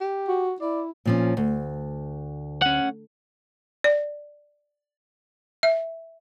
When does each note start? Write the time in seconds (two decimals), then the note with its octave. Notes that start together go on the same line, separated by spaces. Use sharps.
0.01 G4
0.28 F#4
0.61 E4 D5
1.05 A#2 F3 C#4
1.37 D2
2.62 C#4 F#5
3.84 D5
5.63 E5